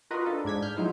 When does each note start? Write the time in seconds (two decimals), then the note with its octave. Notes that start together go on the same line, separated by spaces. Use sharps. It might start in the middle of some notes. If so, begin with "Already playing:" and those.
0.11 F4 F#4 A#4 B4 D#5
0.26 D4 D#4 A4
0.45 G#2 D4 G#6 B6
0.62 F6 G6
0.76 F3 F#3 G#3 D#4 E4 C5